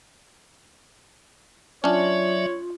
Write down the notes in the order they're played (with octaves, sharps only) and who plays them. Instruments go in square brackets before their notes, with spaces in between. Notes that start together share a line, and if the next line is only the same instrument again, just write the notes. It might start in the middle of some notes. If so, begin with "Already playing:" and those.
[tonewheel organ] F#3 D5 E5 [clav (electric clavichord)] C#4 D4 [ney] F4 [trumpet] C#5